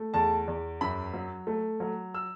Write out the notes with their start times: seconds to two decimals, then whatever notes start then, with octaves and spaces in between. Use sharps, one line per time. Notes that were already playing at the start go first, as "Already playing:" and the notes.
Already playing: A3
0.14 E2 A5
0.48 E2
0.81 F#2 B5
1.13 F#3
1.47 A3
1.80 F#3
2.14 E6